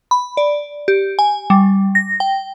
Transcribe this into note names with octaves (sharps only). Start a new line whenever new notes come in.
B5
D5
G4
G#5
G3
A#6
G5